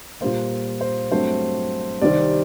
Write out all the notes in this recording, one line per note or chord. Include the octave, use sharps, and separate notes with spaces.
A#2 G3 A#3 C5
C5
G2 F#3 A3 C4 C5
C2 C3 D#3 G3 C4 D5